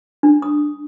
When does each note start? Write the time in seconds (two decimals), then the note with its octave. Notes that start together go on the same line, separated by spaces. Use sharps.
0.23 D4
0.42 D#6